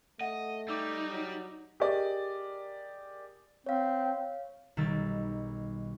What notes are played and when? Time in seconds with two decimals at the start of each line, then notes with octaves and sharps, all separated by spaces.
0.21 A3 D#5 F#5
0.68 G3 D#4 D6 E6
1.11 F#3
1.80 G4 G#4 A#4 D5 D#5
3.66 C4 C#5 F5
4.77 B1 D#3 G3 E6 A6